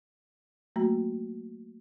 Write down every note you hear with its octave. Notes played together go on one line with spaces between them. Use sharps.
F#3 A3 A#3 F#4 A#5